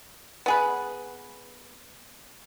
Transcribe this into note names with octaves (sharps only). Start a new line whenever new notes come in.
B3 G#4 B4